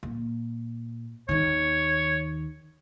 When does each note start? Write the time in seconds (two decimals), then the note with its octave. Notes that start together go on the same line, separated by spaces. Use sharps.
0.03 A#2
1.29 D#2 D#3 C#5